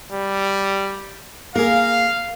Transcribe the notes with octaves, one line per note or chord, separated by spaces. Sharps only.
G3
A#3 G#4 A#4 F5